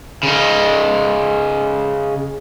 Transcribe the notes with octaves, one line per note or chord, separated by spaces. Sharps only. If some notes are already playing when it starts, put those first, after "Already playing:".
C#3 D#4